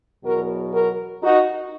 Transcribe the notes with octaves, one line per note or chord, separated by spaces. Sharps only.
E2 B2 F#3 F#4 A#4
F#4 A#4
D#4 F#4